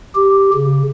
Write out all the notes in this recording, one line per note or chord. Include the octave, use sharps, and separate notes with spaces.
G4
C#3